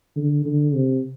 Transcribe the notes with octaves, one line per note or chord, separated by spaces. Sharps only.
D3
D3
C3